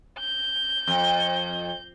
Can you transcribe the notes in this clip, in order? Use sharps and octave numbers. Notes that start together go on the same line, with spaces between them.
G6
F2